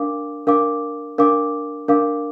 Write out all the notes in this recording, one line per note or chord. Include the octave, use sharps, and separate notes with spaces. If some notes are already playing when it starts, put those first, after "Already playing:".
Already playing: D4 A#4 F5 D6
D4 A#4 F5 D6
D4 A#4 F5 D6
D4 A#4 F5 D6